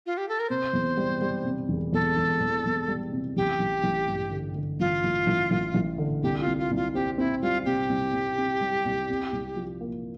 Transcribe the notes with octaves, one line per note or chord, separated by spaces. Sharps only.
F4
G4
A4
A#4
C3 C5
E2
G3
G3
C3
E1
E2 A4
E1
E2
E2
G3
C3
A1 G4
A1
A1
G2
D3
D3
A1 F4
A1
A1
A1
A1
D3
C2 G4
F4
C2
F4
C2
F4
C4 G4
C4 E4
G3 F4
C3 G4
C2
C3
C4
G3
C2
C3
C2
F3
A#3